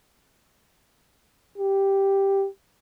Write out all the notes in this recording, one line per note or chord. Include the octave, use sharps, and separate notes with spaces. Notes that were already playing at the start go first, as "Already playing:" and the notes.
G4